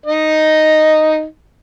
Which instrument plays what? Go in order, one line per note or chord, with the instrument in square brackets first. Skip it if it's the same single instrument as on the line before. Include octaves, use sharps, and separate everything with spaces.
[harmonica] D#4 D#5